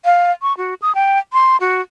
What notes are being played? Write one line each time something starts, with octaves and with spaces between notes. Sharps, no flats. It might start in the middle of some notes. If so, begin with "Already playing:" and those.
F5
C#6
F#4
D#6
G5
C6
F#4